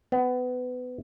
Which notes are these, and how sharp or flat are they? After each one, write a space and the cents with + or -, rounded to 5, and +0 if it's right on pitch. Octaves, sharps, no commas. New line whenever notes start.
B3 +25